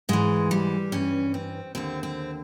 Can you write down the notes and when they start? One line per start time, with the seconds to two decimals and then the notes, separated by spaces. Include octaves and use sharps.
0.09 G#2 E3 G#3
0.51 G3
0.92 G2 E3 C#4
1.34 C4
1.75 D#2 D3 C4
2.03 C4